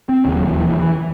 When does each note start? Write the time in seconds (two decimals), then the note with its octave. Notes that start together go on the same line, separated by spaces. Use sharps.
0.09 C4
0.25 E1 D#2 C#3 C#4
0.36 F#3
0.47 E3
0.57 E3
0.68 E3
0.79 E3